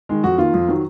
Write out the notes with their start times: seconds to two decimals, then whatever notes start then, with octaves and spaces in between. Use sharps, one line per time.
0.09 D#3 G#3
0.24 F2 F#4
0.38 D#3 A#3 F4
0.54 F2
0.69 D#3 F#3